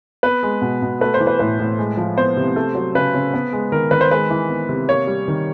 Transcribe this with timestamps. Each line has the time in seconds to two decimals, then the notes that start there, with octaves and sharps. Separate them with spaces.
0.23 B3 B4
0.43 G#3
0.62 B2
0.82 B2
1.01 A3 B4
1.14 C5
1.20 E3
1.27 B4
1.39 A2 B4
1.59 A2
1.79 G#3
1.97 F3
2.17 B3 C5
2.37 C3
2.56 A3
2.75 F#3
2.95 C#3 B4
3.14 C#3
3.34 B3
3.53 G#3
3.72 D#3 A#4
3.91 D#3 B4
4.01 C5
4.11 G#3 B4
4.30 E3
4.49 B3
4.69 C3
4.88 A#3 C#5
5.07 G3
5.28 D#3